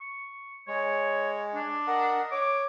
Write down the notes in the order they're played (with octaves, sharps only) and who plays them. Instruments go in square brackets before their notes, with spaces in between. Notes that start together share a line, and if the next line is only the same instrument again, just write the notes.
[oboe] C#6
[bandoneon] G#3 [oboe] C#5
[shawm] D4
[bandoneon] A#4 F#5 [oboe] D#5
[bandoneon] C#5 [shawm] D6